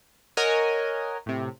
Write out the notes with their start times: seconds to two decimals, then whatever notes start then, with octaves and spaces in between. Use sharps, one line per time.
0.37 A#4 C#5 D#5 F#5 G#5
1.26 A2 C3